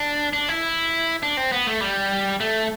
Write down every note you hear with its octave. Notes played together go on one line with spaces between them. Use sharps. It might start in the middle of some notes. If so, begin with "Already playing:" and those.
Already playing: D4
D4
E4
D4
C4
B3
A3
G3
A3